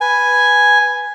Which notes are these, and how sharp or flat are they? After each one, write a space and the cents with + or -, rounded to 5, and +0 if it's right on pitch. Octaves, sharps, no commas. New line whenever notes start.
B4 +0 G#5 +0